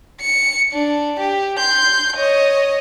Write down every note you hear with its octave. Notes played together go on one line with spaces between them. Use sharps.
C#7
D4
G4
C6 G6
C#5 D#5